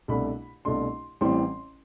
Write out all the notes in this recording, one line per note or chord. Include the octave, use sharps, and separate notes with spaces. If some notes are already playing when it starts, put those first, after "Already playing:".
C2 B2 A3 D4 B5
C2 B2 A3 D4 C6
A1 A2 E3 G3 C4 C6